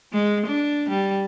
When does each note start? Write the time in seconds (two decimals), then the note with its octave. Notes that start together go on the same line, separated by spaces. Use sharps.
0.13 G#3
0.46 D4
0.90 G3